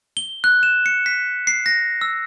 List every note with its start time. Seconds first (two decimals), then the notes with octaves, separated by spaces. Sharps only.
0.17 G7
0.44 F#6
0.63 E7
0.86 C#7
1.06 B6
1.47 C7
1.66 A#6
2.01 E6